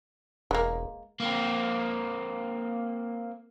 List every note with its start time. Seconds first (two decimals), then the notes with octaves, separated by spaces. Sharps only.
0.51 E1 G#3 A#3
1.20 A#3 C4